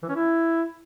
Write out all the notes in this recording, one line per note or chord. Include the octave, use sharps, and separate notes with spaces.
E3
C#4
E4